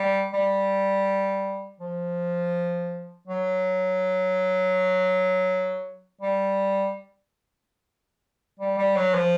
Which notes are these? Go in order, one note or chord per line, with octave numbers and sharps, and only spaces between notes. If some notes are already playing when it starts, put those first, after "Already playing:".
Already playing: G3
G3
F3
F#3
G3
G3
G3
F#3
F3